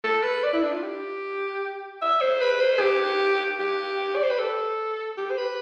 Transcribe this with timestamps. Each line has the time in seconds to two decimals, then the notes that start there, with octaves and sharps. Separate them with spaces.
0.04 A4
0.23 B4
0.44 D5
0.53 E4
0.63 D4
0.73 F4
0.83 G4
2.02 E5
2.21 C5
2.41 B4
2.61 C5
2.80 G4
3.59 G4
4.16 D5
4.23 C5
4.30 B4
4.39 A4
5.17 G4
5.31 C5
5.38 B4